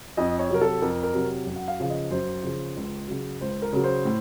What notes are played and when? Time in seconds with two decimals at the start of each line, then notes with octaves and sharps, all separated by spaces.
0.17 F2 D#5
0.39 C#5
0.49 C3 F#3 A#4
0.61 A4
0.82 F2 A#4
1.03 A#4
1.14 C3 F#3
1.47 F#2
1.56 F#5
1.68 F5
1.80 C#3 F3 F5
1.90 D#5
2.11 F#2 C5
2.44 C#3 F3
2.76 C#2
3.08 C#3 F#3
3.41 C#2 C5
3.62 A#4
3.73 C#3 F#3
3.84 C5
4.05 A2